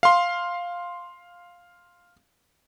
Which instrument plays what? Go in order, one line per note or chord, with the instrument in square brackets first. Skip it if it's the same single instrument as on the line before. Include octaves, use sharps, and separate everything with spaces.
[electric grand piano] F5 C6